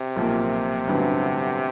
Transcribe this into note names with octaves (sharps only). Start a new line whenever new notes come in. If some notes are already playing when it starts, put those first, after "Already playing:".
Already playing: C3
B1 A#2 F3 A#3
A1 G2 D3 F#3 B3